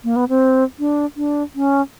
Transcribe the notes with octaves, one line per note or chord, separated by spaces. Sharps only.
A#3
B3
C4
D4
D4
C#4